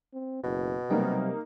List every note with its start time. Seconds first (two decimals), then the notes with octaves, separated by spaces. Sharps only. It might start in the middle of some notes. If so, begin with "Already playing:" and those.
0.14 C4
0.44 F#1 B2
0.90 C3 F#3 G3 A#3 D#4 G4